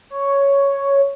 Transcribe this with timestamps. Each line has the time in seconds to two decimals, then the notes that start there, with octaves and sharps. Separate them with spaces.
0.10 C#5